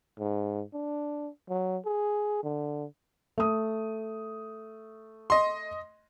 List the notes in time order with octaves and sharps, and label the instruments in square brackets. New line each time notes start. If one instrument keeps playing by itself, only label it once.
[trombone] G#2
D4
F#3
G#4
D3
[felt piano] A3 D#6
[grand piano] D#5 C6